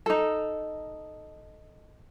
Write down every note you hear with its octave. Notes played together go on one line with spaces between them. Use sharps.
D#4 A4